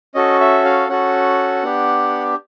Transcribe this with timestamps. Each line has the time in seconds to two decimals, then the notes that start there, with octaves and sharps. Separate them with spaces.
0.15 C#4 F#4 A4 D#5
0.40 E5
0.65 F5
0.89 C#4 F#4 A4 F#5
1.63 B3 D4 G4